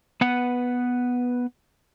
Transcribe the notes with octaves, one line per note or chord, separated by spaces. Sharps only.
B3 B4 F#5